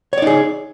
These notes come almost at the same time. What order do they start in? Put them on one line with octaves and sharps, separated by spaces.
C#5 D5 D#4 G#4